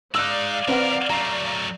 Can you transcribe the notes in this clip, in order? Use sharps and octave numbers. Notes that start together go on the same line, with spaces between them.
G#3 D#4 D5 F5 E6 F#6
E3 C4 A#4 B4 F#5
F#3 A3 A#5 C7